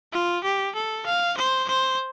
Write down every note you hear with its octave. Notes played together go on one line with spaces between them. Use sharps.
F4
G4
A4
F5
C5
C5